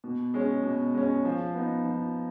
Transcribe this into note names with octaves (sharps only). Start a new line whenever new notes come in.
B2
G#3 C#4
B2
G#3 C#4
F3
B3 D#4
F3